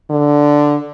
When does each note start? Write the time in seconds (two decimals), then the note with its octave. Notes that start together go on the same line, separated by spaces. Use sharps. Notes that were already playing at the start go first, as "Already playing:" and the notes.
0.10 D3